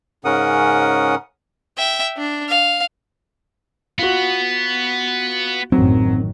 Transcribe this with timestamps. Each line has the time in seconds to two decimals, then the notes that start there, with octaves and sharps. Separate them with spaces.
0.25 G#2 C#3 C#4 A#4 F#5 D#6
1.78 E5 G5
2.17 D4
2.49 F5
3.99 B3 F4 F#4
5.72 A1 F#2 D#3 F#3 C4